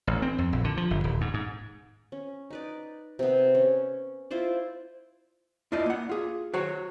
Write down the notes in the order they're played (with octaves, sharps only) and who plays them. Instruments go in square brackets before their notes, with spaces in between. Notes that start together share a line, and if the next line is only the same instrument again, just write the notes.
[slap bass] A1
C4
F2
A#1
D3
F3
G1
D#1
G#2
G#2
[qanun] C#4
D#4 B4 D5
C3 B3
C#4
E4 F4 C5 D5
[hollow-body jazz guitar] E4 F4 D5 D#5
A#3 F#5
F4 G#4
F#4 C5 C#5 F#5